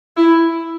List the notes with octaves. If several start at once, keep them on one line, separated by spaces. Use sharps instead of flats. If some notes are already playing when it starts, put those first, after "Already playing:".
E4